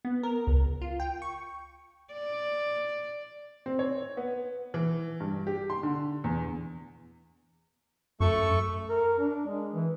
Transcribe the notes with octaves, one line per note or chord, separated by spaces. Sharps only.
B3
A#4
C#2
F4
G5
C#6
D5
C4
C#5
B3
E3
G2
G4
C6
D3
E2
F#2 A3 A4 C#6
A#4
D4
G#3
E3